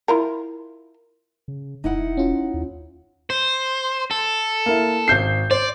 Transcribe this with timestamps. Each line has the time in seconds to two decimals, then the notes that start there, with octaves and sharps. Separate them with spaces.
0.08 E4 F4 A#4
1.48 C#3
1.84 E1 D#4 E4 F#5
2.17 C#4 F4
2.54 D#2
3.30 C5
4.11 A4
4.66 A#3 E4
5.08 G#1 G6 C7
5.51 C5 D5